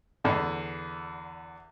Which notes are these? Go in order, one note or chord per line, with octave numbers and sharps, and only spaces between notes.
E2 D3